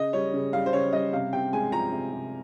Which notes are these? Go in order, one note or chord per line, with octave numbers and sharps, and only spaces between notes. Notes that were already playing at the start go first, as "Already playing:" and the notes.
Already playing: C#3 D#5
G3 C#5
C#3
G3 F5
C5
C#3 C#5
G3 D#5
C3 F5
C3 G5
G#3 G#5
F3 A#5
C3
C3